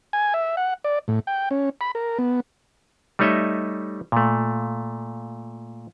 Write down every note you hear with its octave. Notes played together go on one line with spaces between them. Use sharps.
G#5
E5
F#5
D5
A2
G5
C#4
B5
A#4
B3
G3 A3 D#4 C#5 D#5 E5
A#2 A3